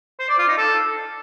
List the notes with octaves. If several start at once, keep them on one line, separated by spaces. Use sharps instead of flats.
C5
D5
F4
D#4
A4